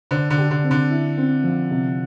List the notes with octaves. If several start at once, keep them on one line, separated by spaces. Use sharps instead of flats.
D3 C5
D3
G4
D3
C4
D3
E4
C4
F3
C3